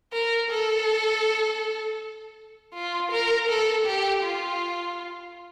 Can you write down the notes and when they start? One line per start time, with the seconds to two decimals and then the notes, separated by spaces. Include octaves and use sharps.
0.13 A#4
0.51 A4
2.74 F4
3.12 A#4
3.49 A4
3.86 G4
4.23 F4